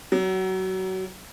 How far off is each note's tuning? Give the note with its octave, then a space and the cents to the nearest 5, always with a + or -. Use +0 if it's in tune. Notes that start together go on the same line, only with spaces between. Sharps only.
F#3 +25